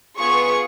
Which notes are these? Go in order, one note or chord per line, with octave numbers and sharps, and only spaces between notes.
B3 F4 G#4 C#6